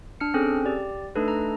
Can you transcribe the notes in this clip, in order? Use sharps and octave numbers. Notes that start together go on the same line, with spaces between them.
D4 F6 C#7
C4 C#4 G#4 A4
G4 D5
A3 D4 D#4 A4 B4
A#5